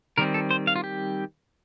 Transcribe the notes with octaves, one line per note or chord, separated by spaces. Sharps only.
D#3 G3 C4 A#4
A4
C5
F5
F4
G4